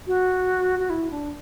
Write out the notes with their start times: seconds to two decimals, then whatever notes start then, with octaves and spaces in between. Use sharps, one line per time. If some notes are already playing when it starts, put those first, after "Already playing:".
0.07 F#4
0.79 F#4
0.90 E4
1.11 D4